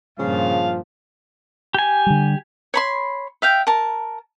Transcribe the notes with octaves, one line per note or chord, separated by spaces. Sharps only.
G2 A#2 C#3 F3 F5
G4 G#5
D3 G3
C#5 B5 C6
E5 F5 G5
A#4 A5